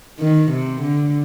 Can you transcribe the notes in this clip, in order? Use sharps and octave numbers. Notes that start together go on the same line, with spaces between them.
D#3
C3
D3